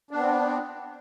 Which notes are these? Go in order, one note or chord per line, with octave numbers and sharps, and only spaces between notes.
B3 C4 D4